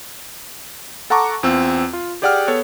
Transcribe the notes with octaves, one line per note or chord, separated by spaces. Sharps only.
A4 F#5 A5 A#5 C#6 D6
E2 C4 F4 E6
F4
G4 G#4 D5 F#5 G5 F6
B3 A4 C#5